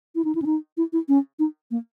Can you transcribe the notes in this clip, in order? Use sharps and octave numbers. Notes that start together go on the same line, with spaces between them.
E4
D#4
E4
C#4
D#4
E4
E4
C#4
D#4
A#3